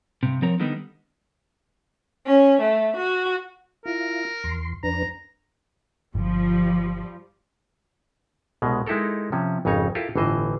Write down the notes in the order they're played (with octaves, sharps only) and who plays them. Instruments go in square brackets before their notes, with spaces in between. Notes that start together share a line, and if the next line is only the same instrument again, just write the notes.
[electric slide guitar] G2 C3
F3 C4 A#4 C#5 A#5
D3 D#3 G3 B3 D#4
[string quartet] C#4
A3
F#4
[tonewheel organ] E4 F4 [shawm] A#4
[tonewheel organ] E2 C6
[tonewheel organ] F2 D4 B4 [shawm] A#5
[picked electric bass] G1 [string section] F3 G3
[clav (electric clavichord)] C2 B2 G#3
G#3 D#4 E4 G4 A4 A#4
C3 F3 C#4
G#1 F2 C#3 D#4 C#5
E4 F4 G4 A4 A#4
G1 A2 E3 C5 D#5